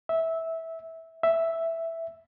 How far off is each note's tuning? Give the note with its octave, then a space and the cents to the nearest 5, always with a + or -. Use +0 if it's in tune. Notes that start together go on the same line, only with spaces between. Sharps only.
E5 -15
E5 +0